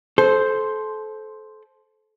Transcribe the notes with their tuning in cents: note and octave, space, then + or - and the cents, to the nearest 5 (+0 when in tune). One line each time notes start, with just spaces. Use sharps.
A4 -25 C5 +0